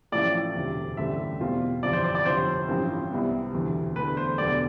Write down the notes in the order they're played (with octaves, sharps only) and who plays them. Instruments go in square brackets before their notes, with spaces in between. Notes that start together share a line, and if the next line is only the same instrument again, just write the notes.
[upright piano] A1 A2 F3 A3 [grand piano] D5
[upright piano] E1 D2 C3
[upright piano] A1 G2 D3 A3 C4 [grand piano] E5
[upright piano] E2 B2 G3 C4 F4
[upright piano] G1 F2 E3 G3 [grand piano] D5
[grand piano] C5
D5
D5
[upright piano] G1 F2 C3 [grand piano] C5
[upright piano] A1 G2 F3 C4
C2 C3 G3 B3
E1 D2 C3 E3
[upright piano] E2 D3 A3 [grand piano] B4
[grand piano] C5
[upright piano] E1 D2 D3 G3 B3 [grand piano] D5